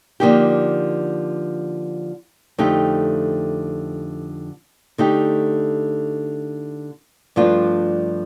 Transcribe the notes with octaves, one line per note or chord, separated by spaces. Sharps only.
D3 F3 A#3 D#4 G4
F2 D3 A3 D#4 G4
D3 A3 D#4 G4
G2 F3 A3 D4 F4